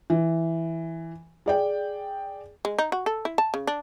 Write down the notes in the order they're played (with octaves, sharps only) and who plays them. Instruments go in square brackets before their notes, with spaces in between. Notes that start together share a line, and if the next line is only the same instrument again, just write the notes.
[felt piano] E3
G#4 D5 G5
[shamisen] G#3
D#4
F#4
A4
E4
A5
C#3
D4